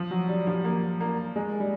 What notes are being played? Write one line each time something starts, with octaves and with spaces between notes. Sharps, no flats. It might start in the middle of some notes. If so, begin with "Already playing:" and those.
Already playing: F3
F#3
G3
F3
A#3
A#3
G#3
G3